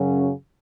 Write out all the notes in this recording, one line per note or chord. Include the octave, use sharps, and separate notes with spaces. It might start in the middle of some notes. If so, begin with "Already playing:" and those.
Already playing: F#2 C#3 F#3 C#4